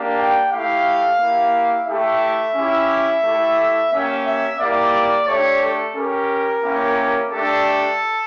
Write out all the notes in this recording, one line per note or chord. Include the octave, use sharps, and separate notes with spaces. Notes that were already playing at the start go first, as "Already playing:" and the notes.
Already playing: A#3 D4 G4
G5
A3 E4 G4 F5
A#3 E4 G4
A3 E4 G4 E5
C#4 E4 G4
A3 E4 G4
A#3 C#4 G4 E5
E5
A#3 E4 G4 D5
A3 D4 G4 C#5
A4
C#4 G4 A#4
A#3 C#4 E4 G4
A3 D4 G4 A4